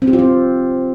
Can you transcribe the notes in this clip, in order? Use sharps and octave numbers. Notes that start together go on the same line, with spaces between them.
C4
G4
F4
C4